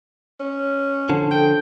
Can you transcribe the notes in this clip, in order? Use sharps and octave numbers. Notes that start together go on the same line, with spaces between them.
C#4
D3 F3 A5
A4 G5 G6